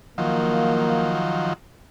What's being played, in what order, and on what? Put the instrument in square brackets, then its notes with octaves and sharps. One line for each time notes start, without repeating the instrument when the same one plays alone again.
[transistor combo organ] D#3 F3 F#3 [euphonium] A#3